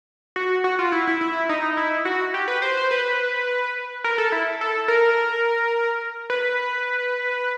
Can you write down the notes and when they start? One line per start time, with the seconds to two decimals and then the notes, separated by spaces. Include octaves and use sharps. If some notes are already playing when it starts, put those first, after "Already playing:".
0.36 F#4
0.64 F#4
0.79 F4
0.92 E4
1.07 E4
1.21 E4
1.49 D#4
1.77 E4
2.05 F#4
2.34 G4
2.48 B4
2.62 C5
2.77 C5
2.91 B4
4.04 A#4
4.18 A4
4.32 E4
4.61 A4
4.88 A#4
6.30 B4